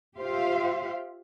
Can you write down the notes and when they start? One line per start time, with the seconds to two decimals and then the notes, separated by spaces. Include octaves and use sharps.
0.18 F4 G4 C5 E5 F5